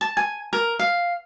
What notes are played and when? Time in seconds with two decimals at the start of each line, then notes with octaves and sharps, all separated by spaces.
0.01 A5
0.17 G#5
0.53 A#4
0.79 F5